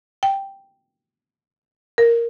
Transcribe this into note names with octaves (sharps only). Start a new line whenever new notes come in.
G5
A#4